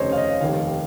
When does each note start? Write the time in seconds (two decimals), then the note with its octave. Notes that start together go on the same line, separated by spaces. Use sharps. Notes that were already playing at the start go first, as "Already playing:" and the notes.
Already playing: F1 D#2 C#3 C5 C#5 D#5
0.12 F5
0.17 D#5
0.41 F1 D#2 D#3 F5